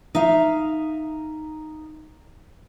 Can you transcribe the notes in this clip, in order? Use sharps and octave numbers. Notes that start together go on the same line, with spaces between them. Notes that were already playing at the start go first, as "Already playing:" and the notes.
D#4 E5 F5